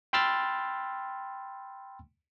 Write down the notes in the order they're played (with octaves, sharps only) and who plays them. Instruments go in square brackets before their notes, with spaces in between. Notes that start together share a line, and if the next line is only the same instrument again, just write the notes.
[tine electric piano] G5 B5 C6 E6 F6 A6